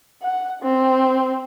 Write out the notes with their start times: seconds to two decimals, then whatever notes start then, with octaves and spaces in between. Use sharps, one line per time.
0.22 F#5
0.62 C4